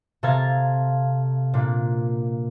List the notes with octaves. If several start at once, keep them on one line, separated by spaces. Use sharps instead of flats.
C3 A4 F5 A#5 G#6 A6
A#2 A#3 D4